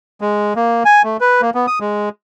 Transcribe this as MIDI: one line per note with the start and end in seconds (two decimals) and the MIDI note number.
0.21 0.53 56
0.56 0.83 58
0.85 1.02 80
1.04 1.17 57
1.21 1.41 71
1.41 1.50 58
1.55 1.66 59
1.67 1.79 87
1.81 2.09 56